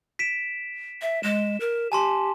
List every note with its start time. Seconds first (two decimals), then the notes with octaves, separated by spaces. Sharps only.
0.19 B6 D7 E7
1.02 E5
1.23 G#3 E7
1.60 A#4
1.92 G4 G#5 A5 C6